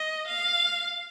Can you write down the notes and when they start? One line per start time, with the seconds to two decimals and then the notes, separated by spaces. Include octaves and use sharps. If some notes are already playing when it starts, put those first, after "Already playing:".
Already playing: D#5
0.28 F5